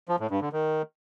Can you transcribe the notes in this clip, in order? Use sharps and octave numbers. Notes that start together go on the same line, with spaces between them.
F3
A2
G2
D3
D#3